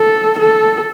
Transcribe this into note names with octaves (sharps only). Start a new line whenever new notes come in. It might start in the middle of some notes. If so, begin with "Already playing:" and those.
Already playing: A4
A4